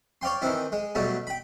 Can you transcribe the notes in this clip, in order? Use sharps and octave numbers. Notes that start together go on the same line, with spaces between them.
C#5 D5 F5 G5 C6
D#3 E3 C4 E4
G#3
B2 F#3 G3 A3
G5 B5